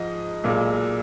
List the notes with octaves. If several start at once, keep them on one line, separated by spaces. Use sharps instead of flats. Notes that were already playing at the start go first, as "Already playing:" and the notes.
Already playing: G#2 F3 D#5
B1 A#2 G#3